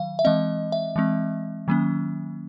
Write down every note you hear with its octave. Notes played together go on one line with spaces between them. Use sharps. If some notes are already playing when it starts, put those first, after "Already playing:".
Already playing: D#3 F#3 F5
E5
E3 G#3 C4 D#5
E5
E3 G#3 C4
D#3 F#3 A#3 C#4